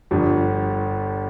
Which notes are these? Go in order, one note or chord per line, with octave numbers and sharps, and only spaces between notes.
G1 G2 F3